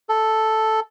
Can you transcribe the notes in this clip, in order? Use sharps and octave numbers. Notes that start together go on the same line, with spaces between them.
A4